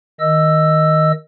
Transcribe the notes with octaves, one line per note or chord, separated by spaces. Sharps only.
D#3 D#5 E6